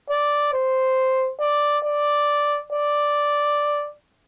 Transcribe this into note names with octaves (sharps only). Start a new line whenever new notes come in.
D5
C5
D5
D5
D5